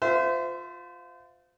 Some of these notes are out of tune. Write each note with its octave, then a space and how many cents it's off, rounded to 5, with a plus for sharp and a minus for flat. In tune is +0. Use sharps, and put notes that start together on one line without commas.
F4 +20 C5 -30 E5 +5